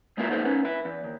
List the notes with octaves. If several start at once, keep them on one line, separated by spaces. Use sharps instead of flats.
C#3 G#3 A#3 B3 E4 F4
A#3 B3 D#4 E4 A4 C5
B3 C#4 D#4 B4
E4 B4
E2
D#2